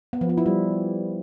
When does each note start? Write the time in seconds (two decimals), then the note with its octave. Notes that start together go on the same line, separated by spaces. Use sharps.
0.13 B3
0.21 F3
0.29 B3
0.38 E4
0.46 G3